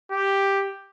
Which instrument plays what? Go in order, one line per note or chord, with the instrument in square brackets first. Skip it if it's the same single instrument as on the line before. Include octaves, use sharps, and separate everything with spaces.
[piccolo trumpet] G4